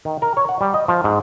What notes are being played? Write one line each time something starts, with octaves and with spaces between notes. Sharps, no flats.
D#3
A#4
C#5
F#5
G3
D#5
F3
G#2